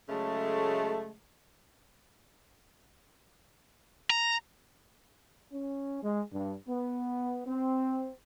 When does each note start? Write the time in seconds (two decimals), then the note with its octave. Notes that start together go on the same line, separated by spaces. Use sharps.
0.09 C#3 F#3 G#3 A3
4.10 A#5
5.52 C#4
6.03 G#3
6.33 G2
6.68 B3
7.46 C4